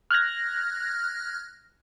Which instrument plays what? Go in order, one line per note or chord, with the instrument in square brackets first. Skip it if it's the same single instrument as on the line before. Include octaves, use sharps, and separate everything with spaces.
[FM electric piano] F6 F#6 G#6 A#6